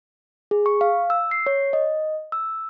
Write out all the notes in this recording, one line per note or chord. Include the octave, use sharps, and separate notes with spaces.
G#4
C#6
F5
E6
C7
C#5
D#5
E6